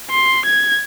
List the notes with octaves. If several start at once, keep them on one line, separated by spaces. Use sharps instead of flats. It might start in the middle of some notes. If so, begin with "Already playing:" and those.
C6
G#6